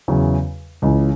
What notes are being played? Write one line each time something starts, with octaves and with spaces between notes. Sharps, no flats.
E2 C#3 F#3
C#2 C#3 E3